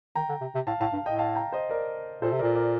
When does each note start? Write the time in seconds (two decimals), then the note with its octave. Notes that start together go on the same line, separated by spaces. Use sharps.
0.15 D#3 G5 A#5
0.29 D3
0.41 C3
0.55 C3
0.67 A2 F5 A5
0.81 A2 F5 A5
0.93 G2
1.06 A2 D#5 G5
1.19 F5 A5
1.35 G5 A#5
1.52 C5 D#5
1.70 A#4 D5
2.22 A#2 A4 C5
2.32 C3
2.39 A#2 A#4 D5
2.55 A#4 D5